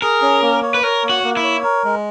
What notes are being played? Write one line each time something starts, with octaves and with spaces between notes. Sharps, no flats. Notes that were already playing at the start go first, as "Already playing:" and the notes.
G#4 A#4
C#4
A#3
C#5
B4
A#4 C#5
A#3
F#4
A#3
E4
C#5
A#4
G#3